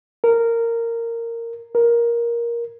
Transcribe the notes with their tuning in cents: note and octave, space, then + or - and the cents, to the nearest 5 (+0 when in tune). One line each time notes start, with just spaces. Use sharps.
A#4 -10
A#4 +15